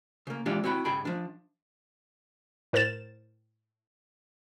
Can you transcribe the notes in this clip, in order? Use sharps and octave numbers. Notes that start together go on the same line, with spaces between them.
C#3 A#3
E3 G#3 D4 F4 G4
C4 E4 F#4 G5 B5
G2 C#3 G#4 G5 B5
F3 D4
A2 A#4 C5 A6 E7